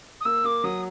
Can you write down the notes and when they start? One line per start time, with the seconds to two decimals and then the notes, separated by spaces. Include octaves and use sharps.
0.20 D#6
0.25 A#3 E6
0.44 A#3 D6
0.64 F#3 D#6